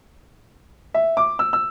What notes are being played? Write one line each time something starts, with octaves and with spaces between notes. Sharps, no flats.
E5
D6
E6
E6